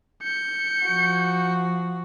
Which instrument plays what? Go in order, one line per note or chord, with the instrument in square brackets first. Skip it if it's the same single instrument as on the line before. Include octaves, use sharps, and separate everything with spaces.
[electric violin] G6 C#7
[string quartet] F3 F#4